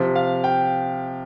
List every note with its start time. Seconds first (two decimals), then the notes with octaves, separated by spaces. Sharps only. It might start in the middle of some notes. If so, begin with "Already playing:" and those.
Already playing: C3 F3
0.15 F5
0.44 G5